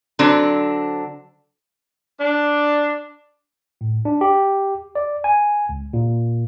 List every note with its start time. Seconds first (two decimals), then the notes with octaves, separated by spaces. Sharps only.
0.19 D3 F#3 C4 D4
2.19 D4
3.81 A2
4.05 D4
4.21 G4
4.95 D5
5.24 G#5
5.69 C#2
5.93 A#2